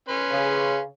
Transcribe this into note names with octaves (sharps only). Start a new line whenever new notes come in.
C#4 B4 C6
C#3